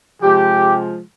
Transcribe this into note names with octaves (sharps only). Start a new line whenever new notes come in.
C3 F3 G#3 G4